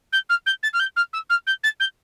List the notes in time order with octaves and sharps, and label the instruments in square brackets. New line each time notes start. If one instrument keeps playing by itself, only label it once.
[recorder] G6
F6
G6
A6
F6
G6
F6
E6
F6
G6
A6
G6